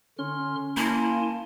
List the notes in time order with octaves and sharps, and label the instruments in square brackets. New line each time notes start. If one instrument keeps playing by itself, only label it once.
[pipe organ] D3 C6 F6 [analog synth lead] C#4
[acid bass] A#3 [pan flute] E4 [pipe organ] G#5 A5 C6